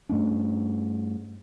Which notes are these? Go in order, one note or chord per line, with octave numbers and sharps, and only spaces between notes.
G2 A3 C#4 D4